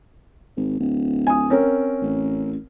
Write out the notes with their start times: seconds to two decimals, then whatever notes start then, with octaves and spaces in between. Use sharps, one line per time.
0.57 G#1
0.79 D1
1.27 G#5 D#6
1.50 C4 C#4 A#4
2.02 A1